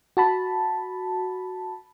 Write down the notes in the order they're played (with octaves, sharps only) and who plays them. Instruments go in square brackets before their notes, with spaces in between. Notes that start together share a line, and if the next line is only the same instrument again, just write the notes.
[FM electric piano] F#4 A5 B5